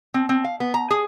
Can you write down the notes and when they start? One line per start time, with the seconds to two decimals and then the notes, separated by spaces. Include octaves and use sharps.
0.14 C4
0.29 C4
0.44 F5
0.60 B3
0.74 A#5
0.91 G#4